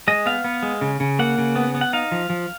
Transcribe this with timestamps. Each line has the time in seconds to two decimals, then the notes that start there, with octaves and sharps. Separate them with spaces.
0.08 G#3 D#5
0.26 B3 F5
0.44 B3
0.63 G#3
0.81 C#3
1.00 C#3
1.19 A#3 F#5
1.38 C#3
1.55 B3
1.75 B3
1.81 F#5
1.93 D#4 F5
2.12 F3
2.30 F3